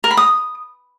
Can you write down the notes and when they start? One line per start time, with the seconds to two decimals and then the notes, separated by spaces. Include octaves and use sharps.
0.04 A#4
0.11 B5
0.17 D#6